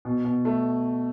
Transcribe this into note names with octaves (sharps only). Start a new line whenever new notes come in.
B2
B2
A3